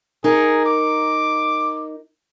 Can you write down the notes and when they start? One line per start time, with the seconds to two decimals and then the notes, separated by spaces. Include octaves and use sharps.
0.24 D#4 G#4 A#4
0.66 D6